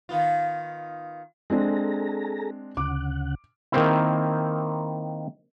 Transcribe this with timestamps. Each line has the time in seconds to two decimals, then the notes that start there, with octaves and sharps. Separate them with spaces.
0.09 D#3 B3 F4
1.50 G#3 C4 D4 G#4 A4 A#5
2.77 D2 C#3 F#5 D6
3.72 D#3 A#3 C4 E4